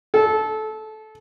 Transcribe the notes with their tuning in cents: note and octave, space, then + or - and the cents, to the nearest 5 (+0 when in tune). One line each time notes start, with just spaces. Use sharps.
A4 -20